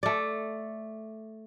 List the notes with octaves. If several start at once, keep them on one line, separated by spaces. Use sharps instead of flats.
A3 D5